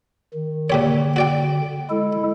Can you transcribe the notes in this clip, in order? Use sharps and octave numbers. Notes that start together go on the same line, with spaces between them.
D#3
A#2 D3 G4 C#5
F#4 D5 G5
G#3 E4 A4